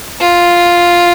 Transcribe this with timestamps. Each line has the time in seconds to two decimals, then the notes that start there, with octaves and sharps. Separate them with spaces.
0.20 F4